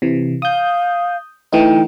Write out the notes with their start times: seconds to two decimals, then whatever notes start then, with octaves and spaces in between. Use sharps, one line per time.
0.02 C3 E3
0.42 F5 D#6 G6
1.53 E3 A3 D#4 G5